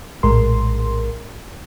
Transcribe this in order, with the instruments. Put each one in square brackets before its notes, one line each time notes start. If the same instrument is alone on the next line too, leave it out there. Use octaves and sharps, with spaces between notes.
[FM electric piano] A#1 A2 G#3 A#4 C6